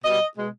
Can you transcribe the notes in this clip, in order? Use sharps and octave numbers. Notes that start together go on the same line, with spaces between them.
B2 G3 D#5
B2 G#3